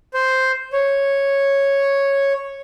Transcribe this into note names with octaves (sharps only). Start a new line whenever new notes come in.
C5
C#5